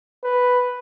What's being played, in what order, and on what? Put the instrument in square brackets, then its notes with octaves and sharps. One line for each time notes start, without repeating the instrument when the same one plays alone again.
[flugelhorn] B4